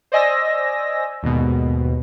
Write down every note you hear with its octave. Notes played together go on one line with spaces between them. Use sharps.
C5 D5 D#5 G#5 E6 A#6
D#2 G#2 B2